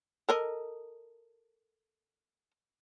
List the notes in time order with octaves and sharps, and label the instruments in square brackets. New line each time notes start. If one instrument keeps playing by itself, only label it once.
[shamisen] A4 A#4 D#5